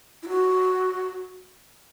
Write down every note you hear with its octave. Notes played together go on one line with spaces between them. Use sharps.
E4
F#4